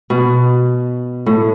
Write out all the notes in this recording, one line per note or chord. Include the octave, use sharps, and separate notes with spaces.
B2
A2